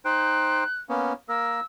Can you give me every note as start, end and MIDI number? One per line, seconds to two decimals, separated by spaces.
0.05 0.64 63
0.05 0.64 72
0.05 0.64 79
0.05 0.80 90
0.89 1.13 58
0.89 1.13 59
0.89 1.13 61
1.29 1.60 58
1.29 1.60 70
1.29 1.64 88